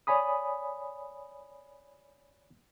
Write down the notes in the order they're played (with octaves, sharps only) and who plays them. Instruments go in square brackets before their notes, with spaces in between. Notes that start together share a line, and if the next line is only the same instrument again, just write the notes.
[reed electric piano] C#5 D5 G#5 B5 D#6